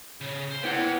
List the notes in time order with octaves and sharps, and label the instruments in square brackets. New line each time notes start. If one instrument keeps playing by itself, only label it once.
[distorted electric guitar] C#3
C5
[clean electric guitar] B3 E4 F#5 [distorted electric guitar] C#5 G5